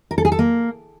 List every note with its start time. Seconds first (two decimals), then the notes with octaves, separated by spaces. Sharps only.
0.11 A#4
0.18 A4
0.25 G#4
0.32 A4
0.39 A#3